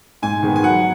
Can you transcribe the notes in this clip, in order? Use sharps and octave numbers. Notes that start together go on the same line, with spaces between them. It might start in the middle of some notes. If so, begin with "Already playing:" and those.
G#2 G#5
D#3 G#3 B3
G#5
F#3 F#5